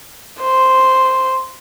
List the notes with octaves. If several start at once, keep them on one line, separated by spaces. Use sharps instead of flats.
C5